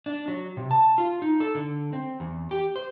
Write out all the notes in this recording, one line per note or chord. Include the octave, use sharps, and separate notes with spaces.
D4
F#3
C3
A5
F4
D#4
A4
D3
C4
E2
G4
C5